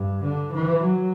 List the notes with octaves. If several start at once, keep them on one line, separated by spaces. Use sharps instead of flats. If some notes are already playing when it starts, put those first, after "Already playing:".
Already playing: G2
D3
E3
F#3